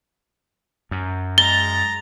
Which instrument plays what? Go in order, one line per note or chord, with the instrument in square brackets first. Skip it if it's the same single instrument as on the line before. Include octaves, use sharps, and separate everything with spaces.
[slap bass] F#2
[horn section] G#3 A#5 [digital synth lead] A6 [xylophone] G7